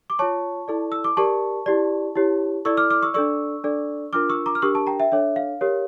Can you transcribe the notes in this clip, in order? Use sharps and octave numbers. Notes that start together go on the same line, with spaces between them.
D6
F4 C#5 A5 C#6
E4 A4 D5
E6
D6
G4 A#4 D5 A5 C#6
E4 G4 D5
E4 G4 C#5
E4 A4 D5 C#6 E6
D6 F6
D6 F6
C#6 E6
D4 A4 D5 C#6 E6
D4 A4 D5
D4 F4 A#4 D6 F6
C#6 E6
A#5 D6
F6
D4 G4 A#4 C#6 E6
A5 C#6
G5 A#5
E5 G5
D4 A4 C#5 E5
F5
G4 A#4 C#5